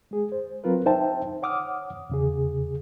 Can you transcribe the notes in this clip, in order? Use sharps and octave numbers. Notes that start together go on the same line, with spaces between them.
G#3 G#4
C5
F#3 C4 F4 A#4 B4
D#4 C5 E5 G5 A5
C#5 F#5 D6 D#6 F6
E2 C#3 G#4